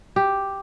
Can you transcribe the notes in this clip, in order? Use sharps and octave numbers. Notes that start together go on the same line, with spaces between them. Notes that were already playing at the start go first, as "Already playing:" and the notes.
G4